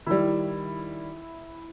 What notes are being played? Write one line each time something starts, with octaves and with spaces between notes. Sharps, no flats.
D#3 G3 E4